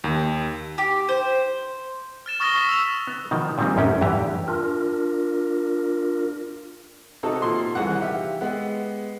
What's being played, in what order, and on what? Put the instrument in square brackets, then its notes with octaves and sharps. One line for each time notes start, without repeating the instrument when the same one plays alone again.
[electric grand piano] D#2
[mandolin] G4
C5
[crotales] F6 A6 E7
C#6 D#6 F6 A6 A#6 G7
C#6 D#6 B6 E7
E6 F7
[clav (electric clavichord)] B3
B2 D#3 F3
A#2 D#3 F3 G3 C4 D#4
A1 F#2 C3 A3 C#4 G5
E2 G2 E3 G4 A#5
[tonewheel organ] D4 F4 A#4
[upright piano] C3 [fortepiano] D#4 F#4 A4
[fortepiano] A#2 C6
[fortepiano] C2 F#5 [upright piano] D#3 E3 G#4
[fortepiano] G4 [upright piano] E5 F5
[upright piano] G#3 B3 F#5